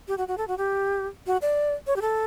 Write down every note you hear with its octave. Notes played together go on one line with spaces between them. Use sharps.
G4
F#4
F#4
A4
F#4
G4
F#4
D5
C#5
G4
A4